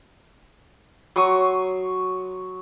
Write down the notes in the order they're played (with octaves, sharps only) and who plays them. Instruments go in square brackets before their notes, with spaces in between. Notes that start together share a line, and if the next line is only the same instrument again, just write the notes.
[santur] F#3 C6 C#6 D#6